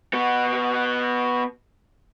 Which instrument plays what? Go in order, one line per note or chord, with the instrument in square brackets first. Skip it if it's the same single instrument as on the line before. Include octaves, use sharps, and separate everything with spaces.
[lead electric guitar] B3 F#4